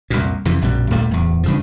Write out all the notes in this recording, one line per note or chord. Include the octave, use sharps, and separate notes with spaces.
C2 F2 A#2
F2 C3 E3
A#1 F#2 B2 G3
D2 A#2 G3 A3
D1 E2
G2 C#3 F3